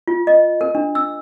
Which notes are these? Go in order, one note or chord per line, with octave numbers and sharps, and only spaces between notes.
F4
D#5
A#4
D4
E6